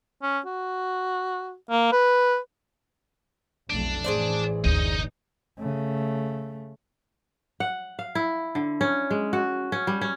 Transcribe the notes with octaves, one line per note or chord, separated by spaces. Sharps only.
C#4
F#4
A#3
B4
F1 B1 A3 D4
A1 E3 G#4 C5 D5
F#1 D2 D#4 D#5
C#3 A3
F#5
F5
E4
D3
C#4
G#3
F#4
C#4
G3
C#4